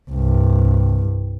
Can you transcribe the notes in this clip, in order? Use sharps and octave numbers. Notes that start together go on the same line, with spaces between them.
C2 G2